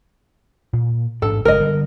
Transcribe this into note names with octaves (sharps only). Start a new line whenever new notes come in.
A#2
A1 G#2 D4 A4
F#1 G#3 A#4 D#5
D3 G3